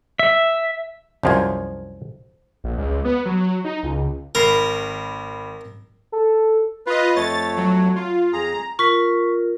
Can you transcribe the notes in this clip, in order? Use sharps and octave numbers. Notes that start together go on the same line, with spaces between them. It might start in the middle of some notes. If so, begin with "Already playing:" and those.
E5
C2 F#2 F3 C5 A#5 G#6
A#1
C#2
B3
F#3
D#4
C#2
G#1 A#4 B5 C7
A4
F4 B4 D#5
F2 A3 C#5 A6
F#3
F4
F2 G#4 A#5
F4 A#4 C#6 B6